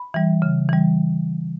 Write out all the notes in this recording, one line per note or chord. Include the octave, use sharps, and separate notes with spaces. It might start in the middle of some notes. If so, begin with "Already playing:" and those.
Already playing: B5
E3 G3
C#3
E3 G3